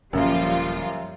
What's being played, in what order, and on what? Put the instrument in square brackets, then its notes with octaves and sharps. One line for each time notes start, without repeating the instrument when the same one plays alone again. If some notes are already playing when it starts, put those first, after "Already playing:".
[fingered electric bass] D#1 D3 A#3 [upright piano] F#2 [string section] F3 G3 F4